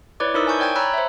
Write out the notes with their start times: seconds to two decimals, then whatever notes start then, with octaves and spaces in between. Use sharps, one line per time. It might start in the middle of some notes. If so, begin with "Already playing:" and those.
0.20 E4 B4 C#5 D5 D6
0.34 D#4 E4 A#4 C5 D#6 E6
0.47 G#5 A5 C#6 G6
0.59 C#5 D5 G5 G6 G#6
0.76 C#5 A#5 B5 E6 F#6
0.94 C5 E5